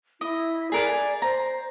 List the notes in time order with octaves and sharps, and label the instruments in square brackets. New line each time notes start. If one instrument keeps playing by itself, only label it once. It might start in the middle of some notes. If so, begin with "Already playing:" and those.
[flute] E4 [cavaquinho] D#5
[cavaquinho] G#4 A#4 B4 [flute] D5
[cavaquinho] G#5
[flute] C5 [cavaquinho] A#5